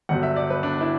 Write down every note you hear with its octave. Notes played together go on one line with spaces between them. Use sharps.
G1 G2 F#3 F#5
E5
D5
B4
D4
E4